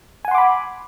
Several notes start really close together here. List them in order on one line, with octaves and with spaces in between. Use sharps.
G#5 F#5 C6 D6 B5